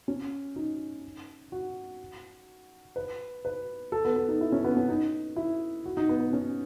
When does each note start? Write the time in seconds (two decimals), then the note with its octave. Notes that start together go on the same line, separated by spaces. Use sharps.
0.08 C#4
0.56 D#4
1.52 F#4
2.96 B4
3.45 B4
3.92 A4
4.05 B3
4.16 B3
4.28 D#4
4.41 E4
4.52 C#4
4.64 B3
4.77 C#4
4.89 D#4
5.36 E4
5.86 F#4
5.97 D#4
6.09 B3
6.21 B3
6.33 C#4